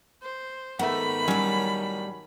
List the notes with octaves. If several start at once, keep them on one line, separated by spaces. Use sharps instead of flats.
C5
G#2 D#3 A3 B3 F#5 B5
A2 F#3 G3 C#4